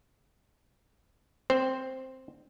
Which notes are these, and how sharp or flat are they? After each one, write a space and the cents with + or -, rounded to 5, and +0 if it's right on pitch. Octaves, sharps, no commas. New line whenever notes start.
C4 +0 C5 +0